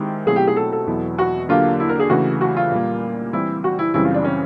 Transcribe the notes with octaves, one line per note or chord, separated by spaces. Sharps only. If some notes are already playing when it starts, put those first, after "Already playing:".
Already playing: D#3 G#3 C4 E4 G4
B2 F#3 A3 C4 E4 G#4
G4
G#4
A4
A4
E2 B2 F#3 B3 E4
F#4
D3 F#3 A#3 D4 F4 G4
E4
A#4
G#4
C#3 E3 A3 F#4
F#4
F4
A#2 G3 A#3
E3 G3 C4 E4
F#4
E4
F#2 C#3 E3 G3 C4 E4
F4
D4
C#4